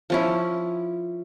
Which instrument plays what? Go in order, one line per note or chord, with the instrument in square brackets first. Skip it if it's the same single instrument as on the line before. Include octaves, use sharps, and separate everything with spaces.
[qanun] F3 C#4 E4